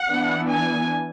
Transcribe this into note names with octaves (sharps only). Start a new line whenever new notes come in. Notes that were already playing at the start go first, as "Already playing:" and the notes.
Already playing: F#5
E3 B3 D4
G#5